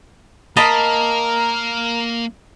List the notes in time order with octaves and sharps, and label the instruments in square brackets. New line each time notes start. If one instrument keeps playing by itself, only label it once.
[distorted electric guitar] A#3 [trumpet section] A#4 [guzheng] D#5 A5 B5